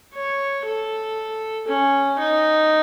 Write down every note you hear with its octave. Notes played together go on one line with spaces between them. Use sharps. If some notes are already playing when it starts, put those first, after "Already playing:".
C#5
A4
C#4
D#4